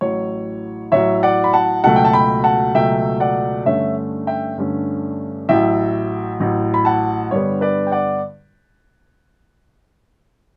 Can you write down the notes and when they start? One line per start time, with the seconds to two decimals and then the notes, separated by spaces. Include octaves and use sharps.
0.01 A1 A2 F#3 C#5
0.92 A1 A2 F#3 C#5 E5
1.23 D5 F#5
1.44 B5
1.53 F#5 A5
1.84 C#2 B2 F#3 A3 F#5 A5
1.96 G5
2.05 A5
2.13 G5 B5
2.44 F#5 A5
2.75 C#2 B2 F#3 A3 E5 G5
3.20 D5 F#5
3.66 G2 D3 A3 C#4 C#5 E5
4.27 E5 G5
4.58 G2 D3 A3 C#4
5.49 A1 A2 F#3 E5 G5
6.40 A1 A2 F#3
6.74 B5
6.85 F#5 A5
7.31 G2 D3 G3 B3 C#5
7.61 B4 D5
7.87 G5
7.92 D5 F#5